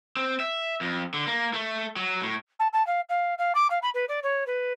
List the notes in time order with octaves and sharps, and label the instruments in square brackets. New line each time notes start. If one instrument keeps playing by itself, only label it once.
[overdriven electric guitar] C4
E5
F2
D3
A#3
A3
F#3
A2
[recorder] A5
A5
F5
F5
F5
D6
F5
B5
B4
D5
C#5
B4